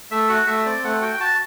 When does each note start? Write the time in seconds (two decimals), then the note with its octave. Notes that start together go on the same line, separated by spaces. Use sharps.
0.11 A3 E5
0.29 F#4 F#5
0.47 A3 E5
0.65 C4 D5
0.84 A3 F#5
1.02 F#4 G5
1.14 G5
1.20 F#4 A5